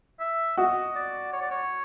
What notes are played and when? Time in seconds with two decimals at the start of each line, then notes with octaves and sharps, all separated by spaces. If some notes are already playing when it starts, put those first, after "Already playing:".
0.20 E5
0.57 F#4 D#5
0.96 D5
1.33 C#5
1.42 D5
1.51 C#5